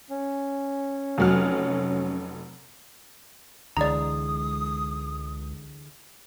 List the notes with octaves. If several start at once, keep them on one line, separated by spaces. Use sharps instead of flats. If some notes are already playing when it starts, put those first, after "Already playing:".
C#4
F1 F#3 F6
C#2 D3 E3 G#3 D5 A#5 D#6